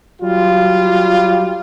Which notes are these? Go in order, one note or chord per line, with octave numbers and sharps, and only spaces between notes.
F#3 G3 F4